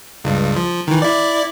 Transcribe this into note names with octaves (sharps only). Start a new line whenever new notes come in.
C#2 G2
F3
D#3 E3
E4 D5